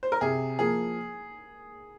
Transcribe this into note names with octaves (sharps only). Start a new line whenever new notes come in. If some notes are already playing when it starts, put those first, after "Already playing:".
C5
A#4
C3 G#4
F3 A#3 G#4